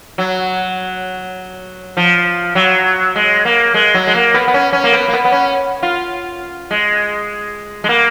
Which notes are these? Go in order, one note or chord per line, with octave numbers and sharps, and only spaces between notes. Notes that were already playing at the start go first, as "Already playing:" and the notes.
F#3
F3
F#3
G#3
A#3
G#3
F#3
G#3
A#3
B3
B3
C#4
C#4
A#3
B3
A#3
B3
B3
C#4
F4
G#3
G#3
A#3